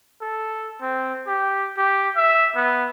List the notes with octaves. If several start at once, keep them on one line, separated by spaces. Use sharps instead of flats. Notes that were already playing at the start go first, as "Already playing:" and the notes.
A4
C4
G4
G4
E5
B3